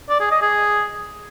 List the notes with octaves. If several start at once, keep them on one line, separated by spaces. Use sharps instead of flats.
D5
G#4
D#5
G#4